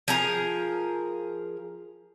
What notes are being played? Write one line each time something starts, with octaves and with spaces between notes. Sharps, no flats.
F3 G#4 A#4